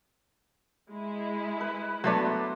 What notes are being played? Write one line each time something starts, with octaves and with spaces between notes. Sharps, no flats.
G#3 E4
B4
F#3 A3 B3 D4 C5